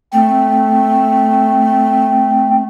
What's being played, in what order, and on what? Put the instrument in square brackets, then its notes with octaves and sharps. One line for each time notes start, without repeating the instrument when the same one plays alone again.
[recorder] A3 [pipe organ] C4